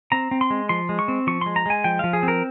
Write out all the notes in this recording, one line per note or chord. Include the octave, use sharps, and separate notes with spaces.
C4 A#5
C4
C6
G#3
F3 C6
G#3
C#6
C4
F3 C#6
G#3 C6
A#5
G#3 G#5
F3 G5
F3 F5
G#4
C4
A#4